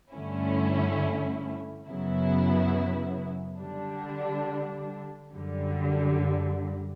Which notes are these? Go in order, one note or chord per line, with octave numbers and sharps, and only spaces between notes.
G2 D3 A3 C#4 E4
F#2 C#3 F#3 B3 E4
D3 G3 D4
F#2 D3 G3